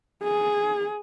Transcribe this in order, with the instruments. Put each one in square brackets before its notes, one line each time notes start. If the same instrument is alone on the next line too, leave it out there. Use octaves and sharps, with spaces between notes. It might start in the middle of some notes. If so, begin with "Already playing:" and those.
[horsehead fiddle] G#4